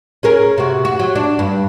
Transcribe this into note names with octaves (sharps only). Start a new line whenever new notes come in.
C#4 G#4 A#4
C3 F#4
F#4
F#3
D4
G2